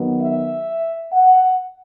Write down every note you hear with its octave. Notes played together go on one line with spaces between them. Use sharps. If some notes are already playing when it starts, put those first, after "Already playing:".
Already playing: D#3 F#3 B3
E5
F#5